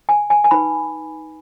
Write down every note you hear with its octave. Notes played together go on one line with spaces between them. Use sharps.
G#5
G#5
G#5
D#4 B4 B5